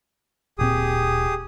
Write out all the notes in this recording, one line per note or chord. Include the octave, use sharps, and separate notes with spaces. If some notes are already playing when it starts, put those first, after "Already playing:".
D1 A#2 C4 G4 G#4 D#6